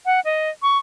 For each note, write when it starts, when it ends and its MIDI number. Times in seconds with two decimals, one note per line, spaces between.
0.06 0.20 78
0.25 0.50 75
0.62 0.78 85